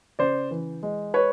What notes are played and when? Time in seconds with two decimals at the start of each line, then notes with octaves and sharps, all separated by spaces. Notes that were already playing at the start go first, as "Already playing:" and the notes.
0.19 C#3 C5 D5
0.51 E3
0.83 G#3
1.14 B4 C#5